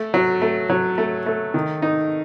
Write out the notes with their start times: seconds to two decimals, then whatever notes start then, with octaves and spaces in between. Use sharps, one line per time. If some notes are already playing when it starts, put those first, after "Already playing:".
Already playing: A3
0.14 F#3
0.42 A3
0.70 F#3
0.98 A3
1.26 A3
1.54 D#3
1.82 D#4